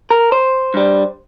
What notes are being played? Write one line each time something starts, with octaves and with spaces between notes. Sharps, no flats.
A#4
C5
G2 G3